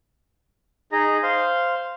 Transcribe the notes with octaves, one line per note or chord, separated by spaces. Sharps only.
D#4 G#4 D#5 A#5
C5 F5 C6